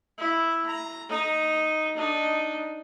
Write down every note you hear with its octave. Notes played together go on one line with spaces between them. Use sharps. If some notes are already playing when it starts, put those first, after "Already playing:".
E4 E5
A#5
D#4 A#5
D4 D#4